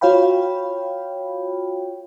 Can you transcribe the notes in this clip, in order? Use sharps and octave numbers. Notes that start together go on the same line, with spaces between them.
F4 F#4 C#5 F5 G5 B5